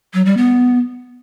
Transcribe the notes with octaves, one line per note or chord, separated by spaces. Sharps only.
F#3
G3
B3